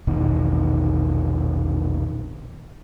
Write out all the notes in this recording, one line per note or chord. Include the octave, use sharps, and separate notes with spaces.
A#1 E2 B2 D#3